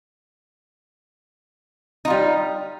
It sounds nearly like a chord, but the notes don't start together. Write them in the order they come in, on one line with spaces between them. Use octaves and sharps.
D#4 F4 G3